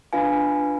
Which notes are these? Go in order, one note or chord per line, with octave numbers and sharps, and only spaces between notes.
D4 F4 B4 F5 G#5